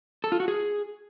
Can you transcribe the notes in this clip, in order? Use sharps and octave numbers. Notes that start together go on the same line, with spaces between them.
A4
F4
F#4
G#4